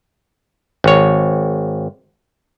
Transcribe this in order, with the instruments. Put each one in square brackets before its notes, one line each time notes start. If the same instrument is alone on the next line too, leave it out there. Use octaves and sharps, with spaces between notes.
[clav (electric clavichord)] G#1 C#5